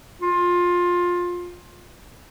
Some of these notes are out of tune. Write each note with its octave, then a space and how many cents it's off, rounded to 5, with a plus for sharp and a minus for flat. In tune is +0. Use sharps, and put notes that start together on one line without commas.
F4 +20